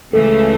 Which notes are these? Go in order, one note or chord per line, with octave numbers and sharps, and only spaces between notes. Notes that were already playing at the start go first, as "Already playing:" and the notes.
C#2 C#3 E3 A3 A4